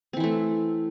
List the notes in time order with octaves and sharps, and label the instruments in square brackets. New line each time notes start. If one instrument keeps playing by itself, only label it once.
[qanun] C4
E3
E4
A3